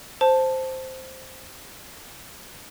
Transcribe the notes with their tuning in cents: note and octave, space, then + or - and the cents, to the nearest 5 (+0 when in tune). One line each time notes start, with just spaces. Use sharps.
C5 +0 A5 +0